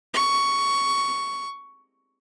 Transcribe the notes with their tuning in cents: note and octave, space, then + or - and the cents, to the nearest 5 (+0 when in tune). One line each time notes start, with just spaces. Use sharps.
C#6 +10